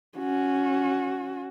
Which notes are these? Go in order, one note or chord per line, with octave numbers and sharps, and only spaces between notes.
C#4 F#4